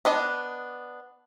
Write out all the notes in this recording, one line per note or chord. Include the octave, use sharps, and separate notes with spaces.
B3 D4 D#5 A5